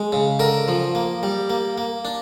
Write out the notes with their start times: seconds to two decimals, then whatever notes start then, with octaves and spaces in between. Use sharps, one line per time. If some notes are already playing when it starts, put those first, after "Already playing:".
Already playing: G#3
0.12 C#3
0.39 D3 A#4
0.68 F3
0.95 A#3
1.23 G3
1.50 A#3
1.78 A#3
2.05 D4